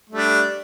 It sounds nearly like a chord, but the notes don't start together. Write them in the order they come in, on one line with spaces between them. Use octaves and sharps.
A3 G3 D4